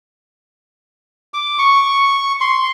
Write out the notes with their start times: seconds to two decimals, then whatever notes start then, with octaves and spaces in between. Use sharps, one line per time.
1.34 D6
1.59 C#6
2.41 C6